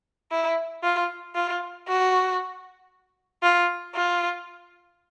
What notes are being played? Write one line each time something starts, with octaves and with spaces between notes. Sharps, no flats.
E4
F4
F4
F#4
F4
F4